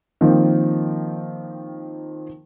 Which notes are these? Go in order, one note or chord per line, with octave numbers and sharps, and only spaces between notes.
D#3 F3 A#3 C4